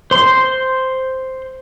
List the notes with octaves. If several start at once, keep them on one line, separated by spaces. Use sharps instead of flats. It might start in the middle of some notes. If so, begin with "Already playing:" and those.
C5 C6